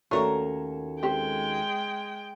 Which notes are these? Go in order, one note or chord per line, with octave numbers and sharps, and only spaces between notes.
D#2 A3 C#4 D4 F#4 A4 A#4 C#5
G#3 C4 G4 G5